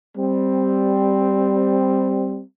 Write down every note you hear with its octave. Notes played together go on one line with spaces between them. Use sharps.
G3 C4